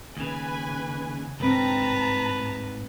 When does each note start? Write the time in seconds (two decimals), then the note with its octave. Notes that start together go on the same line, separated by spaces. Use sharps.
0.17 D#2 C#3 B4 G#5
1.40 D#2 G#2 D3 C4 B4 A5 A#5